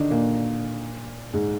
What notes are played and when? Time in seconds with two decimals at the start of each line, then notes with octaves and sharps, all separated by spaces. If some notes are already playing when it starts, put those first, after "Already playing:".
Already playing: D3 D#3 D4 D#4
0.10 A#2 A#3
1.33 G#2 G#3